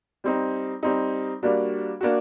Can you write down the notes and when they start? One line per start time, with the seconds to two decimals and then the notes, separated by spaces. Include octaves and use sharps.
0.24 G3 C4 D#4
0.83 G3 C4 D#4
1.43 G3 A#3 D4 F#4
2.01 A#3 D4 F#4